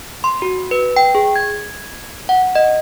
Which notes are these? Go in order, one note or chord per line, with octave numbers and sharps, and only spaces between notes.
C6
F#4
B4
G5
G#4
G#6
F#5
D#5